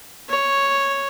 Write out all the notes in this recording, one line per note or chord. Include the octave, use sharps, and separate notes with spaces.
C#5